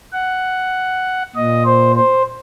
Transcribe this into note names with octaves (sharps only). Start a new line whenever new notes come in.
F#5
A#2 D#5
C5
C5